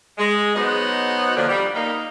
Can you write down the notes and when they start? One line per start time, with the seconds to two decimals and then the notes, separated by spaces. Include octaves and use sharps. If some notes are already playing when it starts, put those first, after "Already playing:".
0.18 G#3
0.55 F#3 B3 D#4 C5 D#5 F#5
1.35 A#2 D3 F3
1.48 G3
1.75 A#3 D#4